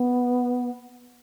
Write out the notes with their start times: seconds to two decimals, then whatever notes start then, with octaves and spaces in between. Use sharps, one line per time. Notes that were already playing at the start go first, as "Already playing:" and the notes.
Already playing: B3